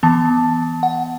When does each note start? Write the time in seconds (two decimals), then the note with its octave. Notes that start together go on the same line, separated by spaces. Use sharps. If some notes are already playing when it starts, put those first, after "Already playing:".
0.03 E3 B3 A5
0.83 F#5